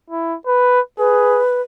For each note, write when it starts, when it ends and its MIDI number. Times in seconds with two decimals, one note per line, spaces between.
0.10 0.36 64
0.47 0.80 71
0.99 1.42 68
0.99 1.61 71